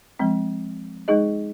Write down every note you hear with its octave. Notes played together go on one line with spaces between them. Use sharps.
F3 G#3 C4
G#3 D#4 G#4 D#5